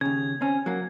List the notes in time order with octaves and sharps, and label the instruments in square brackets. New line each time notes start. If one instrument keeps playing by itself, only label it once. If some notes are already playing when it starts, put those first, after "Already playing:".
[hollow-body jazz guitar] D#2 C#3 [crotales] G#6
[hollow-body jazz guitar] C4 C#4
F#3 A#3